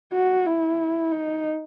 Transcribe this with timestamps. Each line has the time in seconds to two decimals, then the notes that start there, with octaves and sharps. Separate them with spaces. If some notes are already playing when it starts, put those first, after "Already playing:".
0.14 F#4
0.46 E4
1.12 D#4